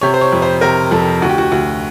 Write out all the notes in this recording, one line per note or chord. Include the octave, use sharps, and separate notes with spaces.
C3 C#5
C5
C#5
F2
C5
C3 A#4
F2 A4
D2 F#4
G4
F#4
D2 F#4